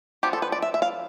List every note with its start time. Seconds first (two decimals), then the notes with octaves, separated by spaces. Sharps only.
0.23 F3 B3 D4 G4
0.33 A4
0.42 B4
0.52 D5
0.62 E5
0.74 E5
0.82 F5